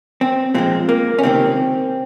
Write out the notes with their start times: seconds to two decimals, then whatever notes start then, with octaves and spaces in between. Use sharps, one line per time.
0.21 C4
0.54 A#2 F3 G#3 C4
0.89 A#3
1.19 C#4
1.23 C#2 C3 D#3 A#3 C4